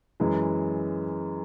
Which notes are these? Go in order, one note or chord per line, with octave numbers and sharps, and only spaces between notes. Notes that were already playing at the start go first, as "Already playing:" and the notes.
F#2 E3 G#3